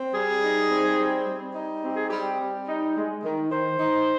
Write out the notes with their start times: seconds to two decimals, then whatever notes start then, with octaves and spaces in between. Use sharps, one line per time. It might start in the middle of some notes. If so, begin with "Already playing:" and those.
Already playing: C4
0.14 G3 G#4
0.43 D#4
0.71 C4
0.99 G3
1.27 G3
1.54 D#4
1.83 C4 G4
1.95 G#4
2.08 G3 G4
2.39 G3
2.67 D#4
2.95 G#3
3.24 D#3
3.51 D#3 C5
3.79 D#4